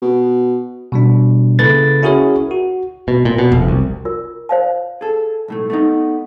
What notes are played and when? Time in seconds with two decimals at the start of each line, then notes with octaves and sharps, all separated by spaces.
0.02 B2
0.92 B2 G3 D4
1.59 C#3 A#3 E4 A4 B4 A6
2.03 C#4 E4 F#4 G#4 A#4 C#5
2.51 F#4
3.08 B2
3.25 A#2
3.38 B2
3.52 F1
3.68 C2
4.05 F4 A#4
4.49 C5 F5 A5
5.01 G#4 A4
5.48 B1 A2 A3
5.70 A3 B3 D#4